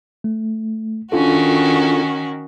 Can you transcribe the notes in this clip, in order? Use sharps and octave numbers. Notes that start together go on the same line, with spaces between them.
A3
D#3 C#4 D4 F4 F#4 A4